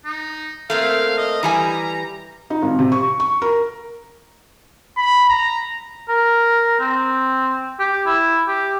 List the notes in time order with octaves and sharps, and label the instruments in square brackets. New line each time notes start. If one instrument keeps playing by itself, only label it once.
[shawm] D#4
[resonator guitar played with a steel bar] A3 A#3 C4 [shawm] F5
[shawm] D#5
[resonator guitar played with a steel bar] E3 G3 G#5 [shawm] A#5
[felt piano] D#4
G#1
C3
C#6
C#6
A#4
[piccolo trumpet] B5
A#5
[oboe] A#4
C4
G4
E4
G4